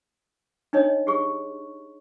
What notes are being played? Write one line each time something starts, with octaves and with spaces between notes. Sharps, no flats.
D4 D#4 C#5 D#5
G4 G#4 C#6